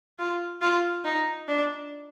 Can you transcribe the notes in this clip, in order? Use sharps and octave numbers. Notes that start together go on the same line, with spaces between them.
F4
F4
D#4
D4